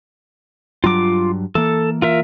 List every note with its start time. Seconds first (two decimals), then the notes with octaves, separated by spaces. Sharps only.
0.84 G2 F#3 F4 D6
1.55 E3 A#3 A4
2.02 F4 A#4 E5